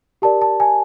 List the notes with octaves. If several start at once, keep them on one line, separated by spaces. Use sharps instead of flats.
G4 A#4 D5 A5
A5
G#5